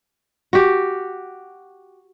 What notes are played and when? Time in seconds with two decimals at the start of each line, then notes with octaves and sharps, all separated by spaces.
0.53 F#4 G4